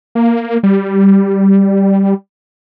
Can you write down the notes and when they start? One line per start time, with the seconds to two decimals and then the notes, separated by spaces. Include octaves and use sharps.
0.15 A#3
0.63 G3